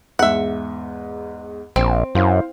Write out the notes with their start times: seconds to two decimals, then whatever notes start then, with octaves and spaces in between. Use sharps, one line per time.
0.19 E2 G#2 E5 F#5
1.76 A#1 C4
2.15 F#2 E4 C5 F5